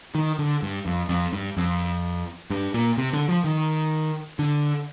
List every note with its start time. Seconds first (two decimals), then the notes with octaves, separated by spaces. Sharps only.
0.15 D#3
0.39 D3
0.62 G2
0.86 F2
1.09 F2
1.33 G2
1.57 F2
2.50 G2
2.74 A#2
2.98 C3
3.13 D3
3.29 F3
3.44 D#3
4.39 D3